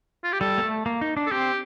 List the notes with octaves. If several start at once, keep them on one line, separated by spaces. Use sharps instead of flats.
F4
G4
G3 A4
A#3
A3
A#3
D#4
D4
A4
C4 G4